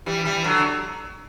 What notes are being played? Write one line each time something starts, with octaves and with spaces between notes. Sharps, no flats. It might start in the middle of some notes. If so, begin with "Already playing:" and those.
E3 G3
E3 G3
D3 F#3